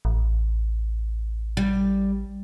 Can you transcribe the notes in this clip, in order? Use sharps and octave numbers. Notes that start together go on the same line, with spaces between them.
A1
G3